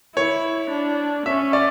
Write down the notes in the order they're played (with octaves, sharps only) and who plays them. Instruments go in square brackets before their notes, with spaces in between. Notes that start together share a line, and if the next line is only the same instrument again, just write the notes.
[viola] E4 [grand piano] C#5
[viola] D4
[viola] C#4 [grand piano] E5
[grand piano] D5